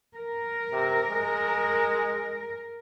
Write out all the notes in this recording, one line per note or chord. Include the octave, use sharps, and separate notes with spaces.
A#4
C3
G#3